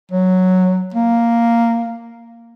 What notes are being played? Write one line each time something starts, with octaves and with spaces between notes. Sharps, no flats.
F#3
A#3